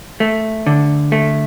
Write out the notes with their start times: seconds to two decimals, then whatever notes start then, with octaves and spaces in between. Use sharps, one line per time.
0.20 A3
0.66 D3
1.12 A3